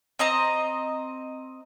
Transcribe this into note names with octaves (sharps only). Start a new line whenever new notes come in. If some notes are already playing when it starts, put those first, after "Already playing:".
C4 D#5 A#5